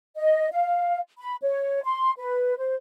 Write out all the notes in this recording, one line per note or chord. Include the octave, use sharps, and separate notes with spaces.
D#5
F5
B5
C#5
C6
B4
C5